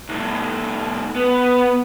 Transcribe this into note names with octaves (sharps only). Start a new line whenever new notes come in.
C2 A2
B3